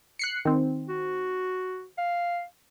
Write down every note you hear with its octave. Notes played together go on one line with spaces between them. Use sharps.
F#6 C7 C#7
D#3 C4
F#4
F5